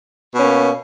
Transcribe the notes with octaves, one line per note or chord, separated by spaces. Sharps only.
B2 A#3 C#4